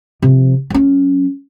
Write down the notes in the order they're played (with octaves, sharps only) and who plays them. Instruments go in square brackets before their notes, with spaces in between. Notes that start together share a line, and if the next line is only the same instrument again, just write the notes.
[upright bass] C3 F3
F#3 C#4